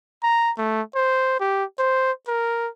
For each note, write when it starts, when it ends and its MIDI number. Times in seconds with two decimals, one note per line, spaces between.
0.23 0.52 82
0.58 0.82 57
0.95 1.39 72
1.40 1.64 67
1.79 2.12 72
2.28 2.68 70